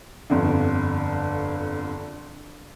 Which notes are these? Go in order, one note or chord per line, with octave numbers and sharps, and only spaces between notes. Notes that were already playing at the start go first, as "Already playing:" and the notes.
G1 F2 D3